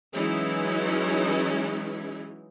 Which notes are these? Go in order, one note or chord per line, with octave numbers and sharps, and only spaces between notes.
E3 F#3 G#3 C#4 D#4 E4